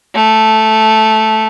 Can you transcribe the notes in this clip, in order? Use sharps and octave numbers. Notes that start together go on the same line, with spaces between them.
A3